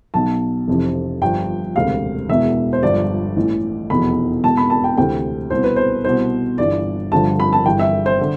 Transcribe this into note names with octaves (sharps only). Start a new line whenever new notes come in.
B1 B2 A5
F1 F2 C3 E3
G1 G2 F3 G5
E1 D2 C3 F5
E1 E2 B2 E5
C5
G1 G2 F3 D5
A1 A2 E3
F1 E2 B2 B5
E1 E2 B2 A5
B5
A5
G5
D2 C3 E3 G5
C2 B2 C5
B4
C5
C2 B2 C5
G1 G2 E3 D5
G1 G2 D3 F3 A5
B5
A5
G1 G2 E3 G5
E5
C5
D3